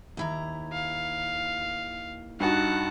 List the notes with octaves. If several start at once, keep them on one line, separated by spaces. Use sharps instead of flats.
D#2 E4 A#5
F5
G2 D#4 F#4 F#5 A5